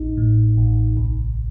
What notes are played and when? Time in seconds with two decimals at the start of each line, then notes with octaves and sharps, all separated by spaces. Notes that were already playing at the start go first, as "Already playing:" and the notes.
Already playing: A1 D#4
0.17 A2
0.58 A1
0.97 C2